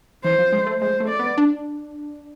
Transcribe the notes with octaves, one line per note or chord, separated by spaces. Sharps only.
E3 C5
F3
G#3
A3
G#3 C5
A3
D5
B3
D4